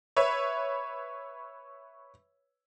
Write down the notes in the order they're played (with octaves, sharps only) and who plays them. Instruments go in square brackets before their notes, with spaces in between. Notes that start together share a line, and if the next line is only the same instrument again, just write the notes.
[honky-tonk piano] B4 C#5 E5